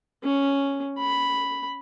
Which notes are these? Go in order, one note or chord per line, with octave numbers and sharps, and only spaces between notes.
C#4
B5